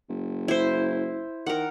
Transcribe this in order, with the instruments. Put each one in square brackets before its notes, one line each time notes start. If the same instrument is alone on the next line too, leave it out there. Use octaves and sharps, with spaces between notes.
[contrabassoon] F#1
[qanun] E4 C5
[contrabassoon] D#3 [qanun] A#4 F#5